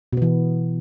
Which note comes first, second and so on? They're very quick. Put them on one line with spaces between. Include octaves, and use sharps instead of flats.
B2 B3 E3